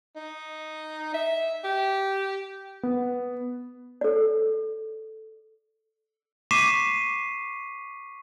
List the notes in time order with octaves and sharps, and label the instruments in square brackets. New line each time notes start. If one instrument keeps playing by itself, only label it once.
[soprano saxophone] D#4
E5
G4
[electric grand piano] B3
[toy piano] A4 D5
[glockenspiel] C#6 D6 B6 C7 D#7 E7